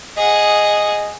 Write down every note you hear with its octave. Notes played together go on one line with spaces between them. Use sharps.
G#4 D#5 F#5